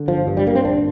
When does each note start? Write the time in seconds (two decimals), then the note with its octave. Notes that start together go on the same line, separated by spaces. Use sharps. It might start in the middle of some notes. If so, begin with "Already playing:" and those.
Already playing: D3
0.08 G1 F3
0.27 G2
0.37 G3
0.46 G1 A#3
0.55 C4
0.64 A#1 D4